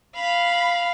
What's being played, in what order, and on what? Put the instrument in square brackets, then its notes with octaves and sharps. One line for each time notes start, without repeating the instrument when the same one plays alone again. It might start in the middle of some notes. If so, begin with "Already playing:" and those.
[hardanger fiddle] F5 [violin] B5